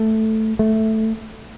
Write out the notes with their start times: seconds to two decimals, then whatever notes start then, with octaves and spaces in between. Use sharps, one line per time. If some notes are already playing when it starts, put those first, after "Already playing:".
Already playing: A3
0.59 A3